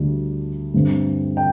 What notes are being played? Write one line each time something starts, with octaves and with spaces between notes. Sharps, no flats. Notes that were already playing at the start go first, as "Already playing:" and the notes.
Already playing: D2 D3 G3 D4
G2 D3 A3 C4
G5